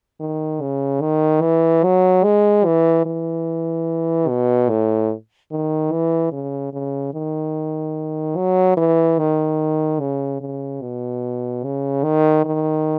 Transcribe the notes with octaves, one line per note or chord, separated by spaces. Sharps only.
D#3
C#3
D#3
E3
F#3
G#3
E3
E3
B2
A2
D#3
E3
C#3
C#3
D#3
F#3
E3
D#3
C#3
C#3
B2
C#3
D#3
D#3